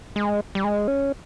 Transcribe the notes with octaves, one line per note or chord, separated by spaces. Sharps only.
G#3
G3
G#3
C#4